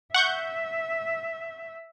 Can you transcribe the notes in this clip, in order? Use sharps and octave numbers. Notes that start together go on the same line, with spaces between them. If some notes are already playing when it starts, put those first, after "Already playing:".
E5 F#5 C#6 G6